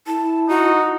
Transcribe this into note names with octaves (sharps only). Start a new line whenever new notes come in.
E4 A5
D#4 F#4